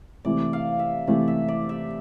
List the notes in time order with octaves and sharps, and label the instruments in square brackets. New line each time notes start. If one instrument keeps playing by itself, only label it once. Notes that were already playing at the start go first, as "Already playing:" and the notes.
[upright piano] C3 E3 A3 [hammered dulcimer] D5
[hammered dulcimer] F5
E5
[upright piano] C3 E3 A3 [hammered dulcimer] D5
[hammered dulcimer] E5
D5
E5